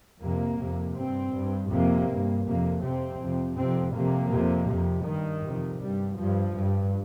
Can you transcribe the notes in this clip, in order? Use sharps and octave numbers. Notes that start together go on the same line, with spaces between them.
F2 C3 A#3
F2 C3
G2 C4
G2
F2 C3 A#3
G2
F2 C3 A#3
F2 C3 C4
F2 C3
F2 C3 C4
F2 C3 A#3
F2 C3
F2 C3
G2 D#3
F2 C3
G2 G3
G2 F3
G2